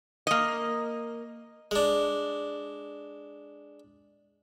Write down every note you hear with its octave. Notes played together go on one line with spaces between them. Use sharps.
A#3 D#5
G#3 D4